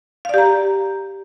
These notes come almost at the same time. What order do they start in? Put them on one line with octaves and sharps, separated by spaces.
F5 D5 G4 A#5